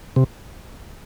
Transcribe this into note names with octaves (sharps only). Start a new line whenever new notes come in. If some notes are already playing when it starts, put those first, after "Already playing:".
C3